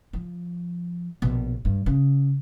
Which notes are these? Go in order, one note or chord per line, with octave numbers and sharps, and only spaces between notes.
F3
A#1 B2
G2
C#3